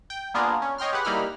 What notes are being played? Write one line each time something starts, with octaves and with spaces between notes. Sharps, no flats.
G5
A#3 B3 D4 F4 G#4 A#4
C#4
C#5 D#5 G5 C6 F6
G4 G#4 B4 F#5
G3 A#3 D#4 E4 B5 F6